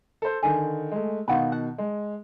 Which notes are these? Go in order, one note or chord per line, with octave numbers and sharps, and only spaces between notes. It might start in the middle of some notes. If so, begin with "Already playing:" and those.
A4 C5
D3 D#3 G#4
G#3 A3
B2 D#3 F4 F#4 B4
F#5 A5
G#3